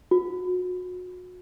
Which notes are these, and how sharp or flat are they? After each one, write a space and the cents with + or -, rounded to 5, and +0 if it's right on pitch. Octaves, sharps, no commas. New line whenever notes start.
F#4 -35